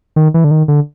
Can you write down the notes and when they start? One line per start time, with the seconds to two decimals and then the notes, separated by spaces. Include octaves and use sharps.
0.16 D#3
0.34 E3
0.44 D3
0.51 D#3
0.68 D3